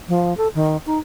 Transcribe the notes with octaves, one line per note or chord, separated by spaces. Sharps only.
F3
A4
D#3
D#4